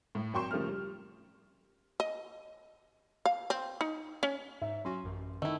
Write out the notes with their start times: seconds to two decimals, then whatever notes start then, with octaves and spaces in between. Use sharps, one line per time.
0.15 A2
0.33 G#1 F#3 G5 C6 C#6 E7
0.51 C#3 F3 G3 A3 A#3 F6
0.69 G3
2.00 D#5
3.25 F5
3.50 C4
3.81 D#4
4.23 C#4
4.62 G#2 E5
4.85 F#3 C#4 F#4 C6
5.04 A1 F#2
5.42 D#3 A3 E4